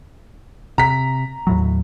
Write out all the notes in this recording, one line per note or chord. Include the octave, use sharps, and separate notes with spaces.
C3 A#5 B6
D#2 A2 F#3